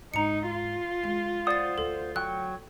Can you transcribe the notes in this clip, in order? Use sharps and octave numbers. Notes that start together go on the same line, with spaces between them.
G#2 D#4 A#5 C#7
F4
G#3
C5 D5 F#5 D#6 A6
D2 A4
F#3 G5 C#6 F#6